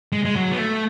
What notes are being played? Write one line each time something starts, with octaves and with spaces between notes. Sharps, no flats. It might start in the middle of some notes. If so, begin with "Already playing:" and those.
G#3
G#3
F#3
B3
A3